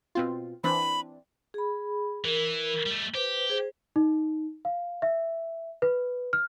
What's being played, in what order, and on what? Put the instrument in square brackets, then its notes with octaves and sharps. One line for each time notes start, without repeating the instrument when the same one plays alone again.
[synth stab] B2 C4 F4
[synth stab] E3 C4 D4 [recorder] B5
[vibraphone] G#4 B5
[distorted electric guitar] E3 [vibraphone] A#4
[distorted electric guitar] G3 A3
[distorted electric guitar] G4 [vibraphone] B4 C5
[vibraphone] G#4 C5
[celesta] D#4
F5
E5
B4
F6